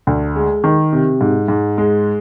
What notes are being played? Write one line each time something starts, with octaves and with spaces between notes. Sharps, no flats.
D2
G#3
D#3
C3
G#2
G#2
G#3